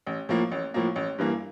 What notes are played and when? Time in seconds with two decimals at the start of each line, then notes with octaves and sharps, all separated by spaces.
0.07 A1
0.29 A2 F3 A#3
0.51 A1
0.74 A2 F3 A#3
0.96 A1
1.18 G2 E3 A#3